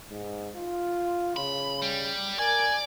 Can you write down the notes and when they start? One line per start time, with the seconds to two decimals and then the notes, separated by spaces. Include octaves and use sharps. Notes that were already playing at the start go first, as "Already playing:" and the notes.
0.11 G#2
0.56 F4
1.36 C#3 B5
1.82 G3
2.39 A#4 D5 G#5